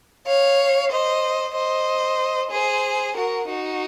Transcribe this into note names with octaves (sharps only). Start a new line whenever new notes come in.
C#5 F5
C5 D#5
C5 D#5
G#4 C5
F#4 A#4
D#4 F#4